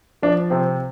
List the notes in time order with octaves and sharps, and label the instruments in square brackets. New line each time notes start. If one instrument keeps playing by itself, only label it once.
[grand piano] F3 D4
C3 C4